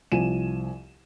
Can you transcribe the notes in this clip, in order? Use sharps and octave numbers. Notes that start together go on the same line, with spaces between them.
C2 F3 G#5 D#7 E7